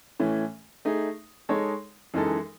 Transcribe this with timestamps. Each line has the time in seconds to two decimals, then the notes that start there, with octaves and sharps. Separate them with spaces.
0.20 A2 E3 A3 C#4
0.85 A3 D#4 G#4
1.49 G#3 D#4 A4 C#5
2.14 F#2 E3 G#3 D#4 A4